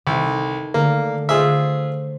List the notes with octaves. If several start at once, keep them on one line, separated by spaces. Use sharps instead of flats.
C2 D#3 A4
D3 A3 A#3
F4 G#4 C5 E5 C#6